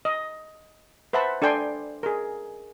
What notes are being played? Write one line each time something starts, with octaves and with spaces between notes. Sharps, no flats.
D#5
B4 C5 E5 F#5 A5 B5
D4 A4 D5 G5 G#5 C6
G#4 A#4